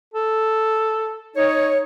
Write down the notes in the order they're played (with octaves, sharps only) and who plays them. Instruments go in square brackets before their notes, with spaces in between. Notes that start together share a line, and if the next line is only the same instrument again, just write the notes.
[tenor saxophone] A4
[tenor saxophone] D#4 [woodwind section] C#5